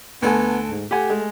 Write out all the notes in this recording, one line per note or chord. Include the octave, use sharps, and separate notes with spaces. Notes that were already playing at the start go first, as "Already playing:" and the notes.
D2 B3 A4 G#5
G#2
A3 G4 F#5 G#5
G#3